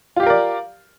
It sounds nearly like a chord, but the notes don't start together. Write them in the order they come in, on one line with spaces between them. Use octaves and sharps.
F4 G4 F5 A#4 D5